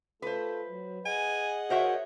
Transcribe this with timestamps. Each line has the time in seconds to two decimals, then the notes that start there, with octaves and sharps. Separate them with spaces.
0.22 A3 F4 A4 B4 C5
0.68 F#3
1.06 G#4 D#5 F#5 G#5
1.70 F#4 A#4 C5 C#5 E5